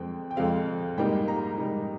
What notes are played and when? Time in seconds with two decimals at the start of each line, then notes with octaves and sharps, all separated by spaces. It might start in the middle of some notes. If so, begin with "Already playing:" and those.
Already playing: F2 D3 G#3 C4 G5
0.31 G5
0.36 F2 D3 G#3 C4 F5
0.97 G#2 G3 A#3 D#4 G5
1.28 A#5
1.58 G#2 G3 A#3 D#4